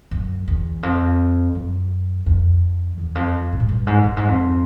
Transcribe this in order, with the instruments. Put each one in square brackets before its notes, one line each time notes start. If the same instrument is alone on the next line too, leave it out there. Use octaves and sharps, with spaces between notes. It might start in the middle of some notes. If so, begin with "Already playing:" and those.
[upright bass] F#2
E2
F2
F#2
F2
E2
F2
A2
G#2
G2
G#2
G2
G#2
F2